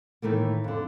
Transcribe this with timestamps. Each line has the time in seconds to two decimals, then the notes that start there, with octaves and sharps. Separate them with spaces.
0.22 A2 D#3 E3 A3 A#3
0.64 F2 D3